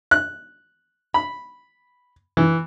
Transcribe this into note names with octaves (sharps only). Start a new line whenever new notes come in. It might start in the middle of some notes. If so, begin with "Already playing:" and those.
F#6
B5
E3